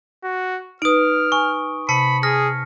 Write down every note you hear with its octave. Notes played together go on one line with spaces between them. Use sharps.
F#4
D#4 B4 D#6 F6 D7
G#5 C#6
C3 A5 B5 B6 C#7
G#4 D#6 F6 A#6